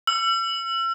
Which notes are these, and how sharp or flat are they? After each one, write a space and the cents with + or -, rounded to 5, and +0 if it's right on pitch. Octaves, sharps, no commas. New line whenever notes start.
E6 +40